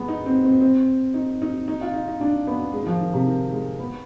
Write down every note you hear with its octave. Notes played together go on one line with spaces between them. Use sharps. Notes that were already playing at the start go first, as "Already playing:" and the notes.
Already playing: G#3 B3
D#4
C4
C4
C4
D#4
D#4
D#4
F4
D#4
D#4
D4
B3
G#3
D#3
F3
D#3
C3
D#3
G#3
B3